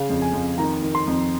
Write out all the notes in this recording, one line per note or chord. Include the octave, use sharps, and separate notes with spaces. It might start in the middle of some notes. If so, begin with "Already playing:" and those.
Already playing: C#3 F5
F2
G#5
F2
D#3 A#5
D#3
C6
F2